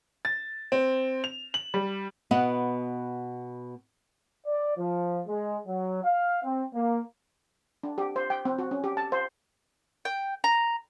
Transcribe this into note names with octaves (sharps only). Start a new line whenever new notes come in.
A6
C4
F7
F#7
G3
B2 B3 D#5 F#5
D5
F3
G#3
F#3
F5
C4
A#3
D4
G4
C5
G5
C4
F#4
C#4
G4
A5
C5
G5
A#5